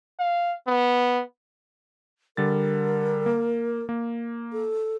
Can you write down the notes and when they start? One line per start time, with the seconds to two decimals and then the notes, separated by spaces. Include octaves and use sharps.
0.19 F5
0.67 B3
2.37 D3 G3 A#4 A6
3.26 A#3
3.89 A#3
4.53 A4